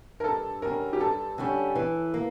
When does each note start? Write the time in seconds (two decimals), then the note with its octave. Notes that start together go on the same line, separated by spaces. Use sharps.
0.20 A#4
0.24 G2 A4
0.62 D3 G3 C#4 A#4
0.93 G4
1.00 G2 A4
1.38 D3 G3 C#4
1.75 E3
2.14 A#3